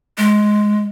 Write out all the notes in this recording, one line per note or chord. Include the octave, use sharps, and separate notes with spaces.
G#3